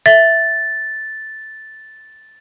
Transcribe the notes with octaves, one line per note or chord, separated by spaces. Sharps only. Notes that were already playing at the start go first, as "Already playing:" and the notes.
E5 A6